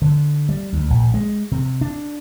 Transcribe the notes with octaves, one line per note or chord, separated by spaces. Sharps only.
D3
G3
D2
A#1
G#3
C3
D4